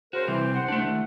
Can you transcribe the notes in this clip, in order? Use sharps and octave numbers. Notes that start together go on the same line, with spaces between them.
C#3 F#4 A#4 C5
C3 E3 G3 C4
C2 F#5
A3 D4
D#3 A3